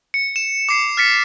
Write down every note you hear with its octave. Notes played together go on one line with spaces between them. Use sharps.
C#7
E7
D6 C7 C#7
F6 A6 B6 C#7